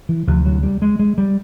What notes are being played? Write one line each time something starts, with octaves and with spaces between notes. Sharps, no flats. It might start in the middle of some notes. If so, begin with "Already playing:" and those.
E3
D2 C3 F3
F#3
G3
G#3
G#3
G3